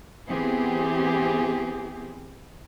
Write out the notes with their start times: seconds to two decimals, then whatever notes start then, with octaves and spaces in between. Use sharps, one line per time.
0.29 E3 B3 C4 G4 G#4